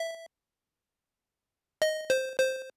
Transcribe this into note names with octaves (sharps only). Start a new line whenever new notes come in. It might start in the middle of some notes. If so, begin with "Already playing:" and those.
Already playing: E5
D#5
C5
C5